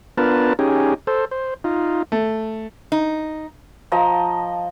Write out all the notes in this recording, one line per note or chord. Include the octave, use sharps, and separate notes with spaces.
B3 D4 F4 A#4 B4 A5
C#4 D#4 G4 G#4
A4 C5
C5
D#4 F4
A3
D#4
F3 D#5 A#5